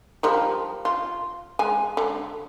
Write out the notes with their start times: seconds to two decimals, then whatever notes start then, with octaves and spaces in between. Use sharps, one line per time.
0.23 F3 G3 A#4
0.85 F4
1.59 G#3 G#5
1.97 D3